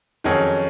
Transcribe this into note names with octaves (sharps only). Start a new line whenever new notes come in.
F2 D#3 F#3 C#4 G#4